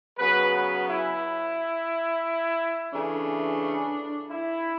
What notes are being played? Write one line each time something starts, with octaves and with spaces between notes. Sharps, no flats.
C#3 F#3 B3 B4
B4
E4
C#3 E3 A3 D4
E4